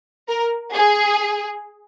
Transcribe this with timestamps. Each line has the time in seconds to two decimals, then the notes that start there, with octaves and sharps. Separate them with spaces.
0.29 A#4
0.73 G#4